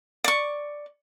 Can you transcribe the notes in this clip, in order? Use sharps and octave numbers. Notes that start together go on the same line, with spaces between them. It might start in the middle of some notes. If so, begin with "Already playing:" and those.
D5 C#6